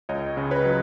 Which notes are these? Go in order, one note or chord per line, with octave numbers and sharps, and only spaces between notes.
C#2 C#5 D#5
C#3
B4 C#5
F#3